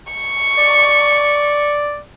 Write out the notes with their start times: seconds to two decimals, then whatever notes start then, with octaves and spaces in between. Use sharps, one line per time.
0.13 C#6
0.58 D5